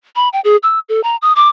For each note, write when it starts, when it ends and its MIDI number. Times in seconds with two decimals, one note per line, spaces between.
0.16 0.29 83
0.33 0.40 79
0.44 0.57 68
0.63 0.79 88
0.89 1.01 69
1.04 1.16 82
1.22 1.33 87
1.36 1.49 86